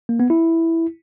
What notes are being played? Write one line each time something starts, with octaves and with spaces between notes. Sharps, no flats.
A#3
B3
E4